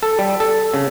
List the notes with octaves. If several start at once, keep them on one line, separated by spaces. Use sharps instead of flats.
A4
G3
A4
C#3